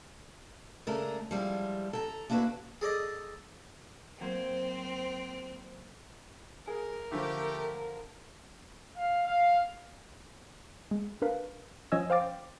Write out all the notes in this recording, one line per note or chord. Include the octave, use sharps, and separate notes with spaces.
C#3 G#3 A3 D4 A#4
F3 G3 G#3 E4
A4 G5 A#5
A#3 D4 E4 F#4 B4
G#4 A4 D5 D#5
F#3 A#3 C4 C5
G#4 A#4
D3 F3 A3 G4
F5
F5
G#3
D4 A#4 B4 F5
F3 C#4 C#5 D#5 G#5 E6
C5 F5 G5 D6 A6